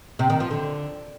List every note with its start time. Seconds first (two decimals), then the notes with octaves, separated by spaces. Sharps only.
0.19 C3
0.30 D#3
0.40 F3
0.51 D3